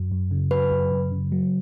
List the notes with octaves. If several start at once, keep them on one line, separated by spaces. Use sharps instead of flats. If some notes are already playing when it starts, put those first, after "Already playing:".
Already playing: F#2 F#3
F#2
C#3
F#3 B4
F#2
F#2
C#3
F#3